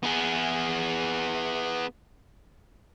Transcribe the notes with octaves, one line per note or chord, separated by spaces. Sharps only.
B3 G#4